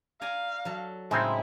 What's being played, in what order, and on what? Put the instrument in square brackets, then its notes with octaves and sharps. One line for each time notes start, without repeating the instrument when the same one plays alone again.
[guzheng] D5 G#5 A#5 [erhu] F5
[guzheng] F#3 A4
[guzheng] A2 C#3 C#4 [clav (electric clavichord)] G#3 C4 D#4 [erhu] E4